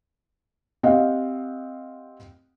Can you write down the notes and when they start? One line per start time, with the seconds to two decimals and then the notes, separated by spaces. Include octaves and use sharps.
0.83 C4 G4 D#5 F5 F#5